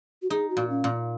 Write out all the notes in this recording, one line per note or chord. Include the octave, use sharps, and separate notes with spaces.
F#4
D#4 G#4
F#4
A#2
C#4
A#2